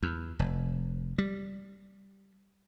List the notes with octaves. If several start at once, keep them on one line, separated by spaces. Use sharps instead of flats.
E2
F1
G3